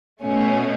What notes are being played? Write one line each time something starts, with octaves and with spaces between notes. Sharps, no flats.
B2 A3 C#4